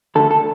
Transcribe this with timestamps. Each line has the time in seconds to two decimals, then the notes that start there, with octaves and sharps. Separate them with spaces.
0.15 D2 D3 A3 A4
0.31 A4